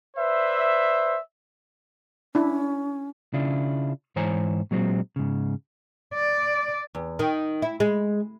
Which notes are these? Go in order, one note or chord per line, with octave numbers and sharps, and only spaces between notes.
B4 C5 D5 E5
C#4 D4 E4
C#3 D4 E4 F4
G#2 E3 C5 C#5 G#5 A#5
A#2 F#3 G#3 C4
G#2 C#3
D5
E2
D#3
E4
G#3